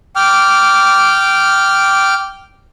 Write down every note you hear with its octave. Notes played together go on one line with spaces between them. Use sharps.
G5 D6 F6